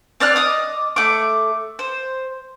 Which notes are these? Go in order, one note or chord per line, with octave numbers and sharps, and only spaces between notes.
C4 D5 F6 F#6
D#5 D6 D#6
A3 D6
C5